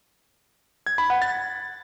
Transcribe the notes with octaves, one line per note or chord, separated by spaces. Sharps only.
G#6
B5
F#5
A6